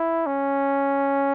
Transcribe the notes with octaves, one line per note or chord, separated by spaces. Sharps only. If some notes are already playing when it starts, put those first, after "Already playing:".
Already playing: E4
C#4